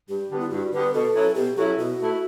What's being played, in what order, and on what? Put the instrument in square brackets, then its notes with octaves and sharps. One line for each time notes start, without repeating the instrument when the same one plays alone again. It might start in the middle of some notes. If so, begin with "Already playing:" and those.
[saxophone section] G2 [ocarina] G4
[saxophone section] D3 G3 B3
[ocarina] E4
[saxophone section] G2 [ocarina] F#4
[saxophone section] D3 G3 B3 [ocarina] B4
[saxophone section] B2 [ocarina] A4
[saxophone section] F#3 C#4 E4
[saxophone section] B2 [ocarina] G4
[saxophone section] F#3 C#4 E4 [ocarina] A4
[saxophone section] B2 [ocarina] F#4
[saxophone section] A3 E4